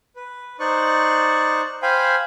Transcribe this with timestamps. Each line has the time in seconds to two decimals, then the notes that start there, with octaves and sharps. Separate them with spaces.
0.16 B4
0.60 D#4 C5 D5 C#6 F#6
1.82 C5 F5 G5 G#5 B5